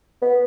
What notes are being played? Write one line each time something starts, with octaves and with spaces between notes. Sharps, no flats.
B3